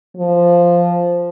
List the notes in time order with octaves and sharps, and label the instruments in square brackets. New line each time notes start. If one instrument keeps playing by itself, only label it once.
[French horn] F3